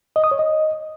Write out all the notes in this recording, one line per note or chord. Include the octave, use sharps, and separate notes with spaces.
D#5
D#6
C#5
D#5